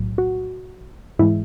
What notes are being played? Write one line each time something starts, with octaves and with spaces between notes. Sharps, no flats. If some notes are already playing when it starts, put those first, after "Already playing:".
Already playing: B1 A2 F#3
F#4
G#2 E3 G#3 E4